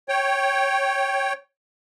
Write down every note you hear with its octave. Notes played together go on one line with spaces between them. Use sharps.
C#5 G5